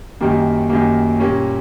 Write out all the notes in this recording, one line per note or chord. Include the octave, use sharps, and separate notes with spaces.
F#2 D#3 G3 A#3
F#2 D#3 G3 A#3
A#2 G3 A#3 C#4